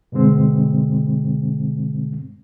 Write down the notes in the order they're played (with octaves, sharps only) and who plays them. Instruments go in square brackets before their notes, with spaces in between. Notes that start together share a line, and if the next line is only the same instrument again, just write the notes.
[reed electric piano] G2 B2 D3 G#3 C4